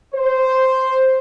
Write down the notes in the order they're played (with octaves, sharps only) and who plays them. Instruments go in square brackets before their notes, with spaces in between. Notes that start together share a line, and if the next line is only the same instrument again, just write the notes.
[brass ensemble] C5